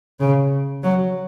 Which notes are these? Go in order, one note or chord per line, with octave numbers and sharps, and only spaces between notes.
C#3
F#3